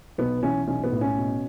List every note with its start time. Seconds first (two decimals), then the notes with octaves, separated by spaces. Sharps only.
0.18 B1 B3
0.43 E3 C#4
0.67 B1 C#4
0.84 B3
0.92 A2
1.01 C#4
1.18 B2